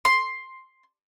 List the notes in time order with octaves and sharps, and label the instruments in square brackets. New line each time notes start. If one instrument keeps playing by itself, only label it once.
[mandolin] C6